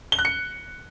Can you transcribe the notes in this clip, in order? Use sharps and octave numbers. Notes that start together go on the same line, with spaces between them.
G7
F#6
C#7